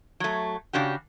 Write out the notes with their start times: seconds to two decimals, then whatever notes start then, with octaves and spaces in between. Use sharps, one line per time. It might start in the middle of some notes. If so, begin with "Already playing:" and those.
0.20 F#3 A3
0.73 C#3 D4 F#4 G4